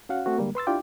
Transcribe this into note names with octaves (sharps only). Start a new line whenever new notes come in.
C#4 F#4 F5 F#5
A3 C4 F#4
D3 G3 G#3 A#3
B4 C6 E6 A6
D4 E4 F4 G4 G5 D6